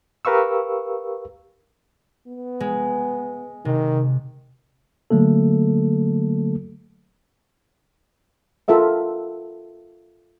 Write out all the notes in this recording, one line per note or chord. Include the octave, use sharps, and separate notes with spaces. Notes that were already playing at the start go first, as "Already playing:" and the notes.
G4 A#4 B4 F5 C#6 E6
B3
G#3
C3 D#3
D3 F#3 A3 A#3 A4
F4 A4 A#4 E5 F#5